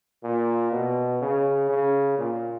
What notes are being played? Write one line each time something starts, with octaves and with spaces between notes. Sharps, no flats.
A#2
B2
C#3
C#3
A#2